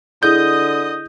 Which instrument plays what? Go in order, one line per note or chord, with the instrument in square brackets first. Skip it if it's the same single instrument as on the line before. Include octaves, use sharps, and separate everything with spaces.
[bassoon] D3 [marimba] E4 G#4 [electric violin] D#5 D#6 [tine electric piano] G6